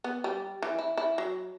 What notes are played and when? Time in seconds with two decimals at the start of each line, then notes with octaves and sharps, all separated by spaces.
0.04 B3
0.24 G3
0.62 E3
0.79 E4
0.97 E4
1.18 F#3